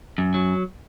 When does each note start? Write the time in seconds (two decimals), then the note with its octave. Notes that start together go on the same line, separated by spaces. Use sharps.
0.18 F#2
0.34 F#3